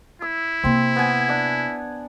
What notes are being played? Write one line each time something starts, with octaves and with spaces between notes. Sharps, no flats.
E4 E6
C3 A#3 C4
B3 G#5
D4 F#5